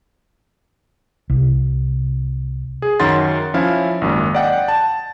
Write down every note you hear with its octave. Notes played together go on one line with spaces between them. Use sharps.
C2
G#4
F#2 D#3 C#5 F#5 C6 A6
F3 C#4 E4 F5
G#1 F#2 A#3
D5 D#5 F#5 G5
A5